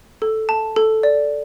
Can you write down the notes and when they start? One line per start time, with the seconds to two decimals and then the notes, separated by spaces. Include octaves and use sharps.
0.22 A4
0.49 A5
0.76 A4
1.03 D5